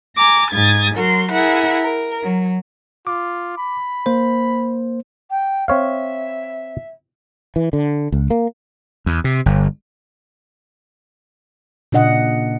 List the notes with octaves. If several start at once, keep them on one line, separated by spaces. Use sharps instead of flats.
G#5 A#5 D6
G#2 D#6 G#6 A6
F#3 F#4 A#4 C6
E4 G#4 A#4 F#5
A#4
F#3
F4 D6
B5
A#3 C5
G5
C4 C#5 E5 F5
E3
D3
C#2
A#3
E2
C3
G1
A#2 C#3 D4 D#5 F#5